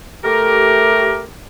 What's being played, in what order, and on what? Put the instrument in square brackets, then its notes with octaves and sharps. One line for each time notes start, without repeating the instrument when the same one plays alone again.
[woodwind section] A3 G4 A#4